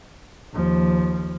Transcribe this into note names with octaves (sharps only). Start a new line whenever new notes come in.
D#2 F3